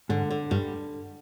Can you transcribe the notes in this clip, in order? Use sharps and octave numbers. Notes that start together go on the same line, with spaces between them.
G#2 D3
D3
G2 G3